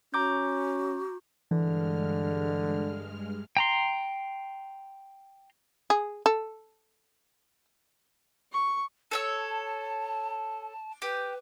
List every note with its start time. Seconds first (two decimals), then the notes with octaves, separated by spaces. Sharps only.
0.14 C#4 F#4 A#5 D6 G6
1.51 G2 D3 E3 G#3 F6
3.57 G5 A#5 C6
5.90 G#4
6.26 A4
8.52 C#6
9.11 A4 C#5 A5 E6
11.02 G4 B4